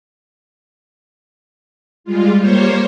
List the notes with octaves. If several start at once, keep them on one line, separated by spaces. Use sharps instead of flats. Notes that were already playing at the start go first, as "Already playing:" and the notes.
G3 G#3 F4
G3 A#3 C5 C#5